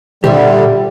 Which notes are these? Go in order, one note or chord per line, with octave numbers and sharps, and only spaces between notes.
A#2 D3 G3 G4 C5 E5